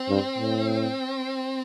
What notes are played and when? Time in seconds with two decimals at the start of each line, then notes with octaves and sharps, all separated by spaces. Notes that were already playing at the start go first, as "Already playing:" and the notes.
Already playing: C4
0.09 G2
0.38 A2